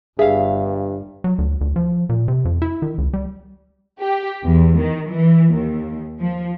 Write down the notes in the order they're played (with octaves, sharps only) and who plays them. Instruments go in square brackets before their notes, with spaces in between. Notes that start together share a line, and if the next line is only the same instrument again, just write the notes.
[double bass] G1 [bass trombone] G2 [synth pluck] G#4 [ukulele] E5 F5
[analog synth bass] F#3
D2
D2
F3
A#2
C3
F2
E4
D#3
C#2
G3
[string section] G4
E2
D#3
E3
D#2
F3